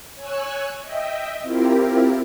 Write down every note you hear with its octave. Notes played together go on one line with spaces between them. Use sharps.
C#5 G#5 C#6 E6 F#6
D#5 E5 G5
C4 E4 F4 G4 A#4